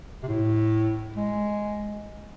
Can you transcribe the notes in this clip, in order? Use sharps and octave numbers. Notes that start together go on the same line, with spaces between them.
C3
A2
G#3